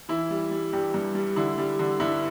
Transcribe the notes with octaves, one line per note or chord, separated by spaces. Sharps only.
E3 E4
G3
G3
G2 G4
G2
G3
D3 E4
G3
D3
G2 E4